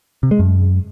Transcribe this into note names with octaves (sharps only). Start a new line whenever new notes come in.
C3
G#3
F#2